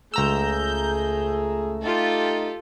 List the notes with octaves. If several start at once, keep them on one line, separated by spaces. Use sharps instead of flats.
C#2 A3 G#4 A#5 E6 G6
D#4 F4 G4 A4